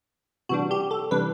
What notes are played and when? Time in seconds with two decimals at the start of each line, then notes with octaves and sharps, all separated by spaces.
0.49 C3 E3 G3 D4 F#4
0.71 G4
0.91 A4
1.11 C3 E3 G3 D4 B4